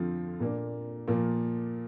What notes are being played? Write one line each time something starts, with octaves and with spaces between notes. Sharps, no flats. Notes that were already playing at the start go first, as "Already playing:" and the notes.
Already playing: F2 D3 F3 C4 F4
A#2 A#3 D4
A#2 F3 A#3